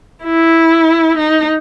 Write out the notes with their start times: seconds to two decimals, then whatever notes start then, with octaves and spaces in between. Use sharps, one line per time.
0.25 E4
1.18 D#4